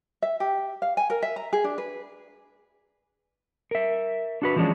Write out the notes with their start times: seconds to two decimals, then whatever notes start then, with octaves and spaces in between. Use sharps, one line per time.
0.22 E5
0.40 G4
0.82 F5
0.97 G#5
1.10 A#4
1.22 E5
1.36 A#5
1.53 G#4
1.64 D4
1.78 B4
3.71 A#4 E5
4.42 D4 F#4 B4
4.56 E3 F3 G#3 C#4 D4